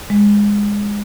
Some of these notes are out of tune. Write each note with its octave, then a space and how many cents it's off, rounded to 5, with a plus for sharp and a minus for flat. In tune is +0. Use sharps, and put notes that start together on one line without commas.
G#3 -15